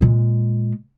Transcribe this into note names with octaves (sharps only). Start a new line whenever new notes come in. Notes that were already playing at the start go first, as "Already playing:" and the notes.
A#2 G#3